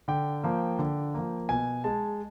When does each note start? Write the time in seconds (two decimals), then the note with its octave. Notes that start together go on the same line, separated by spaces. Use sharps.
0.08 D3 G5
0.43 F3 A#3
0.79 D3
1.14 F3 A#3
1.49 B2 G#5
1.84 G#3 A5